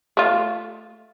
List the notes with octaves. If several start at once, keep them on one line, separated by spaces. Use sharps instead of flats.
A3 F4